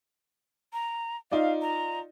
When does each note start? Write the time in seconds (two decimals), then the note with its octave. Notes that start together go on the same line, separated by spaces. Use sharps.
0.73 A#5
1.32 D#4 F4 D5 F5
1.62 A#5